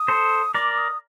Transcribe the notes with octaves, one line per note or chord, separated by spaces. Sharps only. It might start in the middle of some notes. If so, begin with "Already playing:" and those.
Already playing: D#6
A4 C5
A#4 D5 D6
D#6